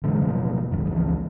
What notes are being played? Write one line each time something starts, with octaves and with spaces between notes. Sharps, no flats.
A#2 D3 E3 G#3
D1 B2 F3 F#3
D#1 G#1 G#2
C#2 E3 F3